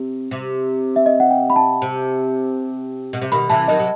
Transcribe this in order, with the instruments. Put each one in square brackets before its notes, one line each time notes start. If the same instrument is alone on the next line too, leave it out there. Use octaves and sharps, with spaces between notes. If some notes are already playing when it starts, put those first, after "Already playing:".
Already playing: [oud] C3
C3
[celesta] E5
D#5
F#5
G5
B5
A5
[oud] C3
B2
C3
[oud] B2 D#3 [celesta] B5
[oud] C3 E3 [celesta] A5
[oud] D#3 F#3 [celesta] D#5
[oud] C3